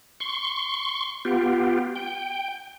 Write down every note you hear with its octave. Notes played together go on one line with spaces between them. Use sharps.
C6 C#6
B3 F4 G4
G5